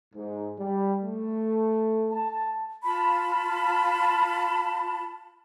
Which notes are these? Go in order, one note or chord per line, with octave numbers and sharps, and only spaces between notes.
G#2
G3
A3
A5
F4 A5 B5